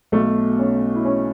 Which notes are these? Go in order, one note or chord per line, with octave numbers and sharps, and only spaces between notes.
B1 B2 A3
C#4
E4
C#4